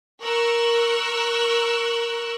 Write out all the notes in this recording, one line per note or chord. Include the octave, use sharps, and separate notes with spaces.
A#4 C#6 E6 F#6